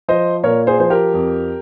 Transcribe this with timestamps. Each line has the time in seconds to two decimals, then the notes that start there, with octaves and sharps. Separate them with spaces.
0.08 F3 C5 D#5
0.44 A#2 A#4 C#5
0.67 G#4 C5
0.79 F3 C5
0.90 G4 A#4
1.14 F2